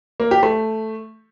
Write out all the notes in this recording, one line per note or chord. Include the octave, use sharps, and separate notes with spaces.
A#3
G4
A3